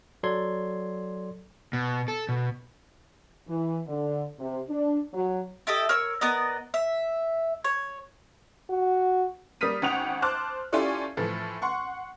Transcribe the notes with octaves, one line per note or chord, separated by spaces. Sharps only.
F#3 A4 D5 C6 G#6
B2
A4
B2
E3
D3
C3
D4
F#3
E4 G4 A4 D#5
A#4 C#5 E6
B3 A#4 D5 D#5
E5
C#5
F#4
G3 A#3 D#6 F6 B6 D#7
G#1 C#4 F#5 G5 F7
C5 A5 D6 F6 F#6
C#4 E4 F4 G4 A4 D5
A2 E3 F3 A4
F#5 C6 C#6